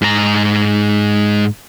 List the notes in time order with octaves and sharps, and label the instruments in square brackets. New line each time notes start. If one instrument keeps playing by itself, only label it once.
[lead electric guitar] G#2 A#5